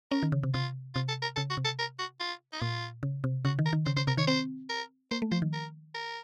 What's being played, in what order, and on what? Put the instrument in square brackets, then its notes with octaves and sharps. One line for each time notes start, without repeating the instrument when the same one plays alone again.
[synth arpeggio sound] C#4 [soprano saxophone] A#4
[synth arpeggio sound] D#3
C#3
C3
[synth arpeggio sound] C3 [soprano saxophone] F4
[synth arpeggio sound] C3 [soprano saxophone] F4
[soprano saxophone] A4
A#4
[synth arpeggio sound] C#3 [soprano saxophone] A4
[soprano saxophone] F#4
[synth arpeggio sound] C3
[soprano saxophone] A4
A#4
F#4
F4
D#4
[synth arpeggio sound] A#2 [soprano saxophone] F4
[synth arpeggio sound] C#3
C3
[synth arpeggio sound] C#3 [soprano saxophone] F#4
[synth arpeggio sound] D#3
[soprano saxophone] A#4
[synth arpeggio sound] D#3
[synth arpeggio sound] C#3 [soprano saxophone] C5
[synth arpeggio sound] C#3 [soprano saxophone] C5
[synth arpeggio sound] C3 [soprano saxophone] A#4
[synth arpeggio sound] D#3 [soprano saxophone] C#5
[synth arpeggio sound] C4 [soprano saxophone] C5
[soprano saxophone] A#4
[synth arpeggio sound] A#3 [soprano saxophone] C5
[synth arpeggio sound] A3
[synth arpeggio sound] F3 [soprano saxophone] C5
[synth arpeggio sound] D#3
[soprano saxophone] A#4
A#4